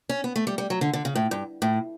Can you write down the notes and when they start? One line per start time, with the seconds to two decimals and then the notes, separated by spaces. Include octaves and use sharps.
0.09 C#4
0.24 B3
0.36 A3
0.47 G3
0.58 G3
0.70 F#3
0.81 D3
0.93 D3
1.05 C#3
1.15 A2
1.31 G2
1.62 A2